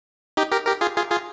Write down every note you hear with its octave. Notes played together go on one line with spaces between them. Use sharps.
D#4 G4
G4 A#4
G4 A#4
F4 G#4
F4 G#4
F4 G#4